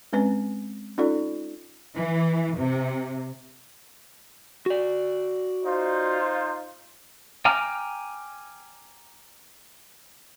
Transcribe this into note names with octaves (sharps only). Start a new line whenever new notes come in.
G#3 C4 C#4 B4 G#5
C#4 D#4 F4 A4 D5
E3
C3
F#4 D5
D#4 F4 C5
G5 G#5 A#5 D6 F6